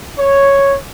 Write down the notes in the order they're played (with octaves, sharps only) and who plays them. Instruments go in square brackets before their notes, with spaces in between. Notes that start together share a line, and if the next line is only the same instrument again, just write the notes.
[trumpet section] C#5